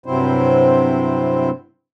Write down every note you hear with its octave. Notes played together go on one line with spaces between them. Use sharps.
G2 C3 F#3 C4 E4 C5